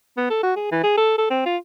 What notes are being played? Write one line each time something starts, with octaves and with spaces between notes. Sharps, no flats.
B3
A4
F#4
G#4
E3
G#4
A4
A4
C4
F4